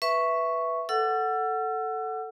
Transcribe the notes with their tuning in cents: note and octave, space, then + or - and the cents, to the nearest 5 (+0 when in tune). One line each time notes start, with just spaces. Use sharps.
B4 +0 E5 +0 C#6 +0
A4 +0 F#5 +0 E6 +40